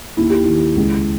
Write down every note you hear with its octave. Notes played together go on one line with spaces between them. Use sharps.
D#2 E4
G4
D#3 E4
C#2